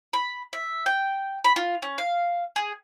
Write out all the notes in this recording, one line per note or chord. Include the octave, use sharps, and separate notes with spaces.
B5
E5
G5
B5
F4
C#4
F5
G#4